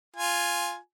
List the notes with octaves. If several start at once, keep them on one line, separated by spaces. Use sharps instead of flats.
F4 G#5